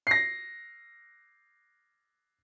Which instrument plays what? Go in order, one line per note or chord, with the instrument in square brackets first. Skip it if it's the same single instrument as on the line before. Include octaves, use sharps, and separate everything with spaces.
[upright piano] A#6 C7